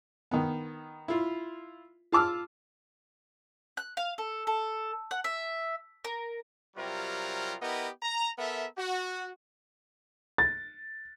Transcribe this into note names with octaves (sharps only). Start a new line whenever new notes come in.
D#3 B3
E4 F4
F4 A5 D6 E6 F6
F#6
F5
A4
A4
F#5
E5
A#4
C3 F#3 G3 F4 A#4
B3 E4 G4 A#4 D#5
A#5
B3 A4 A#4 E5
F#4
A6